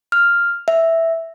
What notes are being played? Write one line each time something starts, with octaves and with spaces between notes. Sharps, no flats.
F6
E5